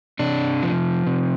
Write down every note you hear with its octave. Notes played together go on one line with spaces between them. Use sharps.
C3 D4
F3
C3